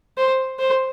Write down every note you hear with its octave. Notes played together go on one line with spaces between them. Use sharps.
C5
C5